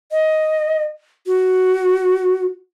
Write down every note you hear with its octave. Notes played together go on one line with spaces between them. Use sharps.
D#5
F#4